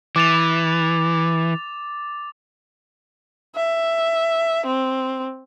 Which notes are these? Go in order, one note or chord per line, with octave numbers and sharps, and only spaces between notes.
E3 D6 A6 F7
E5
C4